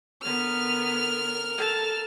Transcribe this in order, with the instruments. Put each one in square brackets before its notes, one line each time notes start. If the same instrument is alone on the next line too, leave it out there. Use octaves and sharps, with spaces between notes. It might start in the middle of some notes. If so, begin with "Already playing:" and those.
[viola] D3 B3 [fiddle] A#4 F6
[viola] A4 A5